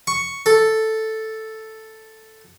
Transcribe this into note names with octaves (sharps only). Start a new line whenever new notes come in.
C#6
A4